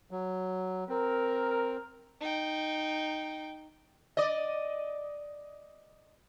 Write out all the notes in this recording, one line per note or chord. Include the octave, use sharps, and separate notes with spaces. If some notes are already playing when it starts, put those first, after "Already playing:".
F#3
C4 A#4
D#4 G5
D5 D#5